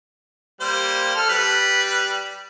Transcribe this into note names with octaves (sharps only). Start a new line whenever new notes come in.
G3 A#3 C5
A4 F6
G3 B4